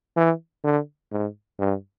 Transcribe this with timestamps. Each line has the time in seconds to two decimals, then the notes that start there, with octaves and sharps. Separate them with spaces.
0.17 E3
0.64 D3
1.11 G#2
1.59 G2